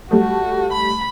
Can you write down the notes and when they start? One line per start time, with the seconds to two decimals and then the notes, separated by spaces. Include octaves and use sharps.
0.11 G3 A3 F#4
0.73 B5